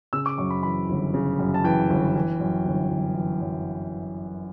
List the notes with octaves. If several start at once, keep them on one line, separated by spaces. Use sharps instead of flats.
C#3 E6
D6
F#2 C#6
B5
E3 B5
G1
C#3
F#2
A5
E3 G5
G1
E3
F#2
G1
G1
E3
F#2